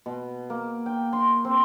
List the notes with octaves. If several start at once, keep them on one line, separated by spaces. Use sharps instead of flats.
B2
A#3
G5
C6
C4